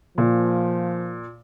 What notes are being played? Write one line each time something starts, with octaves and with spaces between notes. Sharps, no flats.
A#2 F3